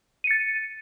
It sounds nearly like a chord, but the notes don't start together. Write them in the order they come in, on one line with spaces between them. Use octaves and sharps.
D#7 C#7 A6